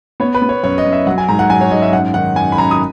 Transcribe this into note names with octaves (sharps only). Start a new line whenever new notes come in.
B3 C#5
B4
B3
C#5
F#2 C#5
D#5
F#2
E5
F#3 F#5
G#5
G#2 A#5
F#5
F#3 G#5
C#5
G#2 D#5
E5
F#2 F#5
D#3 F#5
F#2 G#5
B5
F#2 A#5
D#6